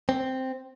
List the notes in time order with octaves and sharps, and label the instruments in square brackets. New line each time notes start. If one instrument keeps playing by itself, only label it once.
[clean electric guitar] C4